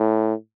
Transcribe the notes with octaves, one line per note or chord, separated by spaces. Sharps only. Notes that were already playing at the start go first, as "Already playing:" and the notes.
Already playing: A2